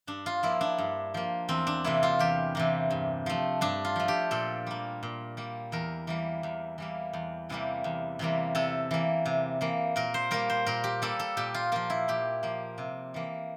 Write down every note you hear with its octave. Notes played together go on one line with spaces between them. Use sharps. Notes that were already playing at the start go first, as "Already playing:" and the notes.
G2 D4
F4
F3 A#3 E4
D4
G2
F3 A#3
E2 C4
D4
C3 E3 A#3 E4
F4
E2 G4
C3 E3 A#3
G2
F3 A3
G2 D4
F4
F3 A3
G4
A#2 A4
G3 A#3
A#2
G3 A#3
E2 A#4
E3 G3 A#3
E2
E3 G3 A#3
E2
C3 E3 G3 A#3
E2
C3 E3 G3 A#3
C3 A4
E3 A#3
C3
E3 A#3
A#2 A#4
C5
G3 A#3 A#4
C5
A#2 A#4
G4
G3 A#3 A4
A4
A#2 G4
F4
F3 A#3 F4
E4
A#2 G4
F3 A#3
C3
E3 A#3